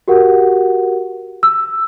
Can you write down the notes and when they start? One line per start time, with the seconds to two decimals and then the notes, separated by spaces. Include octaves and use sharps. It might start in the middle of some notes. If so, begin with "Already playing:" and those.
0.08 F#4 G4 A#4 F#5
1.43 E6